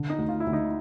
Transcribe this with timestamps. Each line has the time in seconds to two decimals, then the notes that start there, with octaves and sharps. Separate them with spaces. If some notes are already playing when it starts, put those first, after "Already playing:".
Already playing: D3
0.10 D#4
0.18 D2
0.29 F4
0.40 E4
0.47 D2
0.53 D#4